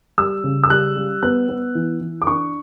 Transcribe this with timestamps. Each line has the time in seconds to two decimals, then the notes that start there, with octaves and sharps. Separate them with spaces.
0.18 G3 E6
0.44 C#3
0.64 E6
0.70 G3 F#6
0.96 G3
1.23 B3 F#6
1.49 B3
1.75 E3
2.01 E3
2.22 D6
2.27 D4 C#6